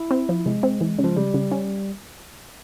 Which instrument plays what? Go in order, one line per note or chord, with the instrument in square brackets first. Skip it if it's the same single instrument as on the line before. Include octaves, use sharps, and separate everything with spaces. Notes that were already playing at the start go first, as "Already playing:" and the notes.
Already playing: [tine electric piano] E4
[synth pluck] C4
F3
[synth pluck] C3 [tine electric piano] G#3
[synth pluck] C4
E3
C#3
[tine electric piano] F3
[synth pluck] C#3 [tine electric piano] G3
[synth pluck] C#3
C#4